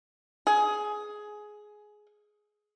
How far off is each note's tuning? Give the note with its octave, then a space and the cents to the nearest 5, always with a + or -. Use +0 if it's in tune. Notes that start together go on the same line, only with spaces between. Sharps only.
G#4 +15